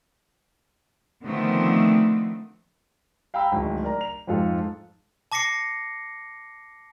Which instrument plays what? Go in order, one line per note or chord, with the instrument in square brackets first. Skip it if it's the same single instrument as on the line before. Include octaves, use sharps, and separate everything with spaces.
[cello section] D3 D#3 F3 A3 B3 C4
[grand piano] F5 G5 A#5 B5 E6
D1 G#1
A#4 D5 A#5
F7
F2 G#2 F4 A4
[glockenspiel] A5 D6 A#6 C7 C#7